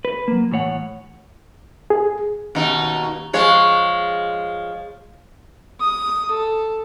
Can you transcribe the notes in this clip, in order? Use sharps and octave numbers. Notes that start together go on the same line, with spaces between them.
B4
F#3 A#3
A2 E3 C#5 F#5
G#4
D#2 B2 D#4
F3 G#3 C#5
D#6
A4